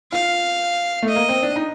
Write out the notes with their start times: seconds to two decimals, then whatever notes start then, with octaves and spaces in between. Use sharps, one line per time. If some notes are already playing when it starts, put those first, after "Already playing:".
0.12 F4 F5
1.02 A3
1.09 D#5
1.16 A#3
1.29 C4
1.43 D4
1.56 D#4